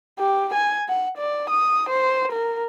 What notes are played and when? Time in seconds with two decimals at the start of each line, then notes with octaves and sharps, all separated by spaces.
0.19 G4
0.54 G#5
0.89 F#5
1.18 D5
1.50 D#6
1.89 C5
2.32 A#4